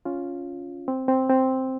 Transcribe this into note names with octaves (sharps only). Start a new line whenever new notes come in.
C#4 F4
C4
C4
C4